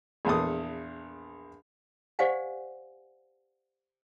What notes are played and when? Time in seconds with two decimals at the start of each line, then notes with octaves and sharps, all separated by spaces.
0.25 A#1 E2 A4 D#6
2.19 G4 C5 D5 F5 F#5 G#5